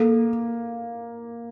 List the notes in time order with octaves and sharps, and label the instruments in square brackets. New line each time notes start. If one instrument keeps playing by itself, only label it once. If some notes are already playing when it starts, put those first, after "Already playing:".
Already playing: [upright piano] A#3 [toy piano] A4